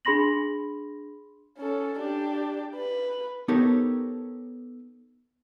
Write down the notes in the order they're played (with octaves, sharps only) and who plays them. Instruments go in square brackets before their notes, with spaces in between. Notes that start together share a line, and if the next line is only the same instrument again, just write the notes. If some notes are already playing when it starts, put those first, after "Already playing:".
[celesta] D4 G#4 B5 C6 A#6 F#7
[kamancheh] C#4 A4
D4 G4
B4
[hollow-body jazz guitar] B3 D#4 G4 A4 A#4 C#5